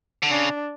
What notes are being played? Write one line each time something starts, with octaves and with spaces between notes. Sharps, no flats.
D3
C#3 D4